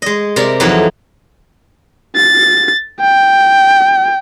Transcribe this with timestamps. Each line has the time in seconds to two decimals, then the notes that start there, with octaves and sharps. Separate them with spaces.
0.02 G#3 D#5
0.36 C3 A#4 D5
0.60 F2 E3 F#3 D#4 A4 F#5
2.16 A6
3.00 G5